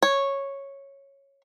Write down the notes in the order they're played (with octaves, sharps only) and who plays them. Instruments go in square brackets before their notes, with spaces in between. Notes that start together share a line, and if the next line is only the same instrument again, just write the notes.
[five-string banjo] C#5